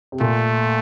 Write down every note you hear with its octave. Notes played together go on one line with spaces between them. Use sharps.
C3
A#2 A3